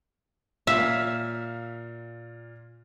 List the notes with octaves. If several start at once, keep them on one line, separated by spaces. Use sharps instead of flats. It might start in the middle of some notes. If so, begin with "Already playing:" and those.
A#2 E5 F5